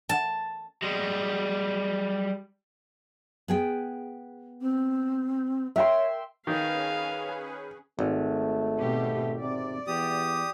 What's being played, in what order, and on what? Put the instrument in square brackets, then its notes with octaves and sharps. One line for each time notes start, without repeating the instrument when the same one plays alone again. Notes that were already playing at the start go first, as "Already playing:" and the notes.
[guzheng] A5
[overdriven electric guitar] G3 G#3
[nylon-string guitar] B3 G#4 G5
[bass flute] C4
[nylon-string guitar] A#4 [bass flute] C#5 [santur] E5 G5 C6
[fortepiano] D#3 [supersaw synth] C#4 G#4 B4 [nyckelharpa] F5 G#5
[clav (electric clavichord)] G#1 [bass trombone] A3
[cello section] B2 C4 G4
[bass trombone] C3 [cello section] D5
[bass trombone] E2 [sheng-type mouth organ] G4 D#6